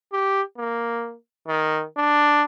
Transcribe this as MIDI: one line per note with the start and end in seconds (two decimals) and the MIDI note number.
0.12 0.42 67
0.58 1.15 58
1.48 1.84 51
1.97 2.44 62